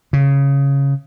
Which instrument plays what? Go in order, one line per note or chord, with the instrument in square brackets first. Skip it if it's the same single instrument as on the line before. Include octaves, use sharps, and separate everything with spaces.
[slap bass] C#3